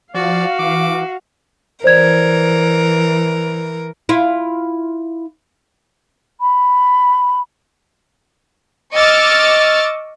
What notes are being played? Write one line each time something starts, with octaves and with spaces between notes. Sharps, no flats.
F3 F#4 D5 F5
E3 D6
E3 A#4 C5 D5 G#6
E4 F4
B5
D#5 C#6 D6 E6 F6 A6